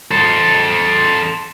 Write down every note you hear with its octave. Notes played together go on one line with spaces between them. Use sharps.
A4 C5